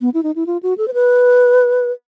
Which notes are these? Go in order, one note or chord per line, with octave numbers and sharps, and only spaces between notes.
B3
E4
D#4
E4
F4
F#4
A4
C5
B4